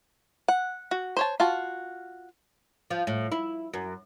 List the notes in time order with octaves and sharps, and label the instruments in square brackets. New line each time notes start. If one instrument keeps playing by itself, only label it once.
[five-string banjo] F#5
F#4
C5 C#5 A5
F4 F#4 A5
[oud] F3
A2
E4
F#2